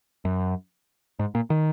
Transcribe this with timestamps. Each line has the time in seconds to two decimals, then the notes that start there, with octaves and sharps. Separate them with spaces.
0.25 F#2
1.19 G#2
1.35 A#2
1.50 D#3